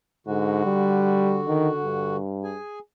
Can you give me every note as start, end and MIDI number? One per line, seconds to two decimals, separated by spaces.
0.27 0.64 44
0.27 2.16 50
0.27 2.16 66
0.65 1.42 55
1.47 1.69 51
1.83 2.58 43
2.44 2.79 68
2.44 2.79 80